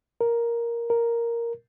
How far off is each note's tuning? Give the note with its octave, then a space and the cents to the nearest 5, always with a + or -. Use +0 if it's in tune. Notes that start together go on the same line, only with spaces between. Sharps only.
A#4 +5
A#4 +0